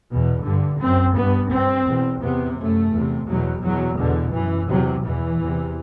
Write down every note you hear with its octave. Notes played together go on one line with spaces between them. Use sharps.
E2 B2
G2 D3
F#2 C4
G2 B3
G2 C4
E2 B2
E2 C3 B3
F#2 A3
E2 C3
E2 B2 F#3
E2 B2 F#3
E2 B2 D3
F#2 E3
E2 C3 F#3
E2 B2 E3
E2 C3